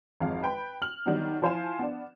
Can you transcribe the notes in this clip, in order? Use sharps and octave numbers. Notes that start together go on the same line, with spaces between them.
G#1 F2 G#4 F5
B4 G5 B5
F6 F#7
D#3 F#3 G3 B3 D4 D#4
F3 E4 C5 F5 G#5 E7
B3 D4